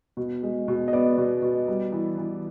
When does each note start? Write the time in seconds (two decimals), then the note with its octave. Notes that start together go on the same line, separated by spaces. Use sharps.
0.17 B2
0.43 G#3
0.68 B2
0.88 D#5
0.93 B3 D5
1.18 B2
1.42 B2
1.68 G3
1.92 E3
2.18 E3